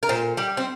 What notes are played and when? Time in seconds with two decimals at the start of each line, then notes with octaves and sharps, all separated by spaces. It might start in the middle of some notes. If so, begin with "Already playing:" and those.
0.03 A#4
0.09 A#2 C5
0.37 G3 G4
0.57 C4